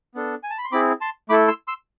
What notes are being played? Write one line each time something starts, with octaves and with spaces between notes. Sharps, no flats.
B3 D4 A4
G#5
A5
B5
C6
C4 E4 G#4 B5 D6
A5 C6
A3 E4 A4 B5 D6
C6 E6
C6 E6